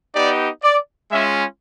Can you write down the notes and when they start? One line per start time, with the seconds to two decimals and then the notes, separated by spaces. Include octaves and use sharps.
0.14 B3 D#4 G4 D5
0.63 D5
1.11 G#3 C#4 F4 E5